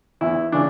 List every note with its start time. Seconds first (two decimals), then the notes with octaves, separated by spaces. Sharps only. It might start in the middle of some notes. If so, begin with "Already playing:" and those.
0.21 E2 E4
0.52 C#3 E3 D4